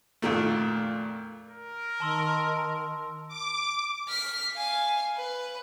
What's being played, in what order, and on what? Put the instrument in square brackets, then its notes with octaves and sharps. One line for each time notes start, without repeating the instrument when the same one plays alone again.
[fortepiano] F2 A#2 D#3 A3
[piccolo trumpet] A#4
[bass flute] D#3 [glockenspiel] A5 C6 E6
[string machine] D6
[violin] F6 B6
F5 G#5
B4